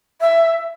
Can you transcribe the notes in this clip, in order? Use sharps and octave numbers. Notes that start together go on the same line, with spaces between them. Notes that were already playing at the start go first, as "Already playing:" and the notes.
E5